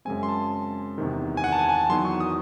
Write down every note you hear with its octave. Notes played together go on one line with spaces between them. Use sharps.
F#2 C#3 G#3 C4 G#5
C6
A5
E2 C3 D#3
G#5
F#5
A5
G#5
G#5
A5
E2 D#3 F#3 C6
C#6
D#6